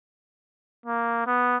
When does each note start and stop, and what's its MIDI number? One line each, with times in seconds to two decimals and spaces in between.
0.86 1.25 58
1.27 1.57 59